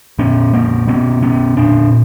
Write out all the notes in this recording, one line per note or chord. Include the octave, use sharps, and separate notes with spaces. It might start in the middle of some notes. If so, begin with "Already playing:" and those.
A#2 B3 C#4
A#3 C4
B2 B3 C#4
B3 C#4
A#2 C4 D4